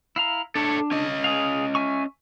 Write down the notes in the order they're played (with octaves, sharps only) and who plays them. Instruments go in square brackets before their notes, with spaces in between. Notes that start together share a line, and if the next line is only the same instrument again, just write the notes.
[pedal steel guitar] E4 F5 A#5
[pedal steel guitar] D4 [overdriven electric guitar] A4 C#5
[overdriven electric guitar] C#4 D#5
[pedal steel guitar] G#4 F5
E5 G#5 C#6